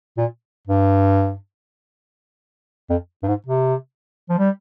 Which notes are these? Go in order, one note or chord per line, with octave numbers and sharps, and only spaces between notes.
A#2
G2
F2
G2
G#2
C3
F3
G3